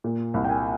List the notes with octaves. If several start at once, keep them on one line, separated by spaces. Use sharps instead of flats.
A#2
C2
G5
G#5